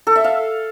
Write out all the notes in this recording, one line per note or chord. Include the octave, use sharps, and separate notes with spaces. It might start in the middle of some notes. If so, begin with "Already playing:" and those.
A4
E5
F5